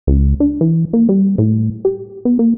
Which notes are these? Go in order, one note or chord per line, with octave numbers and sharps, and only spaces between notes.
C#2
D4
E3
A#3
G3
A2
G4
B3
A#3